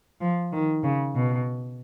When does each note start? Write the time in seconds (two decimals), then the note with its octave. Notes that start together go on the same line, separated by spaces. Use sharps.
0.20 F3
0.52 D#3
0.83 C#3
1.14 B2